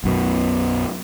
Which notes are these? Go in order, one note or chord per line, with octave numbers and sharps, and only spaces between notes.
B1 F#2 B2